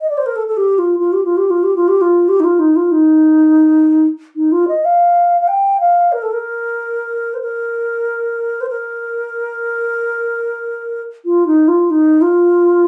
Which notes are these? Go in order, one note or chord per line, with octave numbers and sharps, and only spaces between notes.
D#5
D5
C5
A#4
A4
A4
G4
F4
F4
G4
F4
G4
F4
G4
F4
G4
F4
G4
D#4
F4
D#4
F4
D#4
D#4
F4
D#5
F5
F5
G5
F5
A#4
A4
A#4
C5
A#4
C5
A#4
F4
D#4
F4
D#4
F4